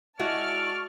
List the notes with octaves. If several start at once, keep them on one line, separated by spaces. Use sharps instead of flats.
G#3 E4 F#4 D5 A5 C#6 F6